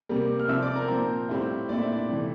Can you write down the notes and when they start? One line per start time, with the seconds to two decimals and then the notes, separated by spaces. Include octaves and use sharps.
0.09 C3 G3 A#3
0.40 F6
0.48 C3 F3 C4 E5 E6
0.62 D5 D6
0.75 A#4 A#5
0.88 A#2 F3 C4
1.29 A2 G3 C4 E4
1.69 A#2 A3 C4 E4 D5
1.80 E5
1.92 D4 D5
2.09 C3 E3 A3